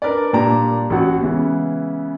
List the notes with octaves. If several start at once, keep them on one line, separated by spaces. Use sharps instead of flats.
D4 A#4 B4 D5
A#2 G3 D4 A#5
A1 F#4
C#3 E3 G#3 B3